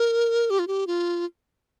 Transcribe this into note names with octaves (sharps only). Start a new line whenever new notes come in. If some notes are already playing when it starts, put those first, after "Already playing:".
Already playing: A#4
G4
F4
G4
F4